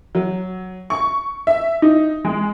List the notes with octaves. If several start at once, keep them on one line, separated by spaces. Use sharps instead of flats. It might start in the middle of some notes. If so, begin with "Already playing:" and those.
F#3
C#6
E5
D#4
G#3